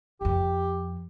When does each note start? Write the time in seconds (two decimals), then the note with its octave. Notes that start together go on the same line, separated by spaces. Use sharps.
0.21 F2 F3 G4